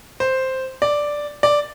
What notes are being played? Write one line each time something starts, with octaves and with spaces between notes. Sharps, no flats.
C5
D5
D5